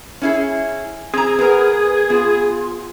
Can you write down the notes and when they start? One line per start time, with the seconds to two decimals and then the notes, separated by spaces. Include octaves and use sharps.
0.21 C#4 E4 G#4
1.14 C4 G#4 A#5
1.39 B3 G#4 A#4 B4
2.10 B3 F4